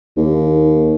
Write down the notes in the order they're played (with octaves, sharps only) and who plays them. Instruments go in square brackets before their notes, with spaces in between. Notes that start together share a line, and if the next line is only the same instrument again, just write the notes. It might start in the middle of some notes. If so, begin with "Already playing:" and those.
[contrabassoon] D#2